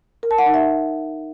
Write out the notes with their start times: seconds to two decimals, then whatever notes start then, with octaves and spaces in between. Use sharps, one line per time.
0.23 A#4
0.31 A5
0.38 F#5
0.46 D#4
0.54 E5